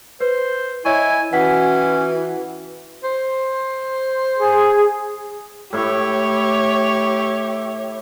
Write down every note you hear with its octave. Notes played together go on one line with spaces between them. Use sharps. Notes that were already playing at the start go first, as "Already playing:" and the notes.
B4 C5
E4 C#5 D#5 G#5 C#6
E3 C#4 F#4 F#5 G5 B6
C5
G#4
A2 E4 G4 C#5